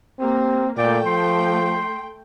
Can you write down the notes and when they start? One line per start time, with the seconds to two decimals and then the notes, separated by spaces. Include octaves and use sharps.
0.20 A#3 C4 G4
0.77 A#2 A3 D5 G5
1.06 F3 C6